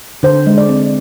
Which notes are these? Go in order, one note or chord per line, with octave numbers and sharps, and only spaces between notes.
D3 C5
G#3
D5
C4